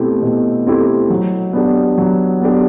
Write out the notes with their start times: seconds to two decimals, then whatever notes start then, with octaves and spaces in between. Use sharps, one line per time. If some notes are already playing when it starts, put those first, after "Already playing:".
Already playing: B2 A3 C4 E4 G4
0.22 B2
0.66 A3 C4 E4 G4
1.10 F#3
1.53 B3 D4 G4
1.98 F#3
2.41 B3 D4 G4